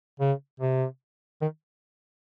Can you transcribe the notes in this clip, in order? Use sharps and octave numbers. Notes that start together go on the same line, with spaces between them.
C#3
C3
D#3